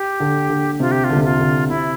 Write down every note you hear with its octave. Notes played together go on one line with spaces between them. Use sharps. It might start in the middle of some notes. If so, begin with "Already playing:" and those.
Already playing: G4
D3
D3
C3 F4
G4
F4
D3
C3
D3 F4
D3
C3 E4